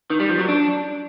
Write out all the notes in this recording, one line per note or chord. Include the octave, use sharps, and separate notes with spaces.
D#3
G3
F3
F#3
D4